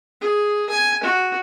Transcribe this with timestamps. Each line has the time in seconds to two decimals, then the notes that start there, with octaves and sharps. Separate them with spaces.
0.21 G#4
0.70 G#5
1.03 F#4